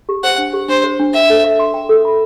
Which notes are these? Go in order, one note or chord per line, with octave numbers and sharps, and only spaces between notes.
G4
C5 F#5
D4
G4
D4 C5
C5
D4
E5 G5
A4
E5
C6
G5
A4
B5